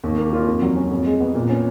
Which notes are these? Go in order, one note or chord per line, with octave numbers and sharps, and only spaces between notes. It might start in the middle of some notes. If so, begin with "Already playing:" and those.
D#2
A#3
F4
F2
F#3
C#4
F2
G#3
B3
A#2
C#4